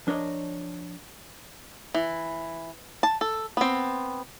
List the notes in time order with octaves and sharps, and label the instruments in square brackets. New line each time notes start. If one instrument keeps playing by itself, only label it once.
[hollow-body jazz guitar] F3 D4 A#4 C#5 D#5
[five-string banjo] E3
A5
A4
B3 C4